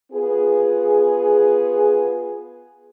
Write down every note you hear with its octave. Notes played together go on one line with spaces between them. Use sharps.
B3 F4 G#4